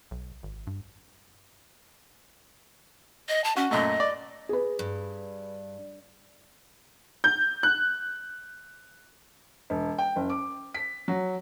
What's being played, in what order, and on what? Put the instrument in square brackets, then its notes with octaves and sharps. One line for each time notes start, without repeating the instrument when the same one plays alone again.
[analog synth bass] B1
G#1
G2
[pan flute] D#5
A5
[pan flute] C#4 [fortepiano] F#4
[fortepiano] F#2 A#2 A3 [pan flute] D#5
[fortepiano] D5
[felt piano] G#4 B4
[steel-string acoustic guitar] G2
[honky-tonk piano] G6
F#6
[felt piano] E1
G5
F#1
D6
B6
F#3